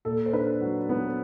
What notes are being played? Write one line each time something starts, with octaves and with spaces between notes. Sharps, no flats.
A#2 A4
C5
D4 B4
F#3
B3